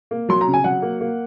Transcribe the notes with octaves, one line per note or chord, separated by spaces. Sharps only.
A#3
F#3 C6
A#5
C#3
G#5
F#3 F#5
A#3
A#3